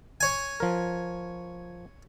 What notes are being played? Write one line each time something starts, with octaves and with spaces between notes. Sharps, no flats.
C#5 G#5
F3 A#4